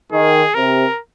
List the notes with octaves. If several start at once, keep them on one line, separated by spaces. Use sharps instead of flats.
D#3 G#4
C3 A#4